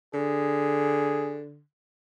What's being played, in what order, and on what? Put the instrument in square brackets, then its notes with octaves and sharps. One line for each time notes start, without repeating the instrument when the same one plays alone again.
[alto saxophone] D3 [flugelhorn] G#4